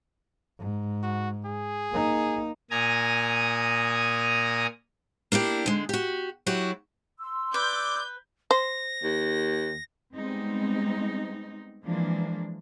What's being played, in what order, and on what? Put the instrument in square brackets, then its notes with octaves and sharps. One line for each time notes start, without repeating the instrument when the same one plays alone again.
[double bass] G#2
[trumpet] F#4
G#4
[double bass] A#3 D#4
[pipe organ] A#2 G#5 A#5 D#6
[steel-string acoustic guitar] A#3 D4 E4 G4
D3 G#3
F#4 G4
F#3 E4 F#4 G4
[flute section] C6 E6
[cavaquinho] B4 [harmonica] D5 D6 [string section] G6
[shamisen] C5 [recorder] A#6
[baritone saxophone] D#2
[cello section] G3 G#3 B3 C4 D#4
E3 F3 G#3 A#3 D4